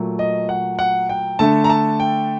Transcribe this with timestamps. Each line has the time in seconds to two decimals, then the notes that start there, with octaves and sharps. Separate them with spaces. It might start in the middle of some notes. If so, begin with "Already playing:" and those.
Already playing: A#2 F#3 A3
0.19 D#5
0.49 F#5
0.79 F#5
1.09 G5
1.39 D3 A3 A5
1.64 A#5
1.70 A5
2.00 G5